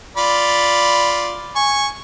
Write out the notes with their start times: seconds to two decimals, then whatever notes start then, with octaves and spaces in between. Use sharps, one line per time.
0.17 F4 D5 B5
1.56 G#5 C#6